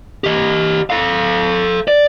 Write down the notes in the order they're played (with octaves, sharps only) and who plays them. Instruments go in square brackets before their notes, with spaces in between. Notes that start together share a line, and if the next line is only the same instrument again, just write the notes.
[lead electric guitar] G4 D#5
A4 F5
D5